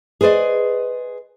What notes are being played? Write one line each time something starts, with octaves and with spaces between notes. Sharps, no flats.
G#4 B4 C5 D5 D#5